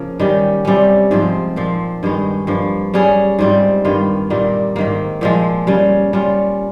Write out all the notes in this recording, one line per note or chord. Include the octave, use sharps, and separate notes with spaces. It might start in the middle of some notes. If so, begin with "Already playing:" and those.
Already playing: C#3 F3 A#3
D#3 G3 C#4 G4
C3 G3 C#4
G#2 F3 C4
A#2 F3 C4
G2 D#3 G#3 D#4
G2 F3 A#3
G3 C#4 G#4
G#2 G3 C4 F4
G2 D#3 A#3 F4
A#2 G3 A#3 D#4
G#2 D#3 A#3
A#2 F3 G#3
C#3 G3 C#4
G3 C#4 F4